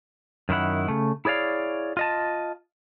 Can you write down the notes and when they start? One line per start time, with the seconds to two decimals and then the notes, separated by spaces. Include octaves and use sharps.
0.49 F#2 D#3 E4 F#5
0.88 C#3 A3
1.25 E4 G#4 C#5 D5 F5
1.97 F4 D#5 A5